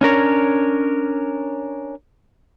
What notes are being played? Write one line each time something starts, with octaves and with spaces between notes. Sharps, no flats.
C#4 D4 A#4 C#5